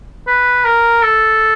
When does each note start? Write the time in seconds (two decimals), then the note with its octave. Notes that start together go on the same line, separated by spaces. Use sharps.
0.28 B4
0.65 A#4
1.03 A4